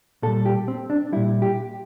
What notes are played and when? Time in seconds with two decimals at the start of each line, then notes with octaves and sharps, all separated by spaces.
0.22 A#2 A4
0.28 G3
0.46 G4
0.68 C4
0.90 D4
1.12 A#2 G3 E4
1.42 G4